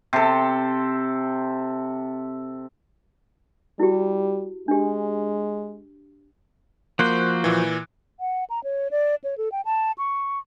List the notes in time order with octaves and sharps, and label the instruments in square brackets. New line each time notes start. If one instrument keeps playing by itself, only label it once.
[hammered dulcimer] C3 A4
[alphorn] G3 [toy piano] E4 F#4 G4
[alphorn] G#3 [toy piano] D4 G4
[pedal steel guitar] F3 F#4 C5 [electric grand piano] A#3 F#6
[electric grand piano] A#2 E3
[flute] F#5
A#5
C#5
D5
C#5
A4
G5
A5
C#6